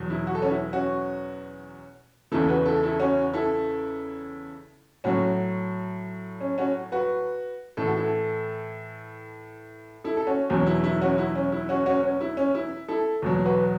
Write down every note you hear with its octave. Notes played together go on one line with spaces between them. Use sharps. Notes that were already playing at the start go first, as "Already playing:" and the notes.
Already playing: E2 B2 F#3
E4
F#4
A4
C#4 F#4
E4
C#4 F#4
E2 C#3 E3 E4 A4
F#4 B4
E4 A4
E4 A4
C#4 F#4
E4 A4
A2 F#3 C#4 F#4
C#4
C#4 F#4
F#4 B4
A2 E3 A4
F#4
E4 A4
E4 A4
A4
C#4 F#4
E2 B2 F#3 C#4
E4
E4
C#4 F#4
E4
C#4
E4
C#4 F#4
C#4 F#4
C#4
E4
C#4
E4
E4 A4
E2 B2 F#3
F#4 B4